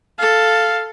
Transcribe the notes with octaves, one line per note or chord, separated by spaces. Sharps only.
A4 F5